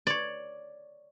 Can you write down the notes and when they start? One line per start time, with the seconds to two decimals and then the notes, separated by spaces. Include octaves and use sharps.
0.07 C#5 D5